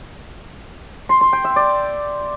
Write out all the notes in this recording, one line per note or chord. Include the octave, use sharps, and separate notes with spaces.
C6
C6
G5
E5
D5